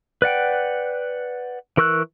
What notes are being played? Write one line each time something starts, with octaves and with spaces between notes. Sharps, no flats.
B4 D5 F#5 G5
E3 A#4 C#6 E6 F#6